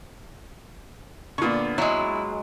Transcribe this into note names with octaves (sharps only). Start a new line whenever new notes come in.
A#2 D3 B3 C#6
F#3 G#3 E4